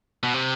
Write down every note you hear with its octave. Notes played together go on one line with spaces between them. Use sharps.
B2
C3